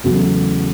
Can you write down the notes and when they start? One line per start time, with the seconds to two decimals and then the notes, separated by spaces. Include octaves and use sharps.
0.04 E2 C#3 F#3 A3 F#4